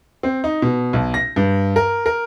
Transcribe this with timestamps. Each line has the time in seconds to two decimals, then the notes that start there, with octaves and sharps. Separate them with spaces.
0.23 C4
0.44 D#4
0.62 B2
0.93 B1
1.14 A#6
1.36 G2
1.76 A#4
2.06 A#4